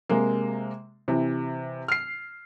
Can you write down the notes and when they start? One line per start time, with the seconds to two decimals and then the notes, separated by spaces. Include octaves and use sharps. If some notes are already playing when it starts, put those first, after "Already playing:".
0.09 C3 G#3 A#3
1.08 C3 E3
1.88 F6 C7